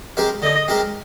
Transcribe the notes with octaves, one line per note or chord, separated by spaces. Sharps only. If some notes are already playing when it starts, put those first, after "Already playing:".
G#3 C4 G4 A#4
D3 D#5
G#3 C4 G4 A#4